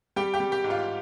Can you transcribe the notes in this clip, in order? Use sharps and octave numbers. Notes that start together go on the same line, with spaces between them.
G3 G4 G5
G4 G5
G3
G4 G5
G#2
F4 F5